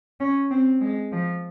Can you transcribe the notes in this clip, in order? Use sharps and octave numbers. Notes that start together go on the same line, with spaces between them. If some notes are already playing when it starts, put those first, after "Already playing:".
C#4
C4
G#3
F3